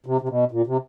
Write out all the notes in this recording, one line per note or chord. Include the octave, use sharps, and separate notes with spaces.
C3
C3
B2
A#2
C3